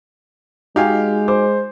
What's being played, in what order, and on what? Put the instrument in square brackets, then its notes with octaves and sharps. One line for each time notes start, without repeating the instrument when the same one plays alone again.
[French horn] G#3 [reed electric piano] D#4 F#4 G#5 [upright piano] G4 F5
[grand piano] C5 [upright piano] D6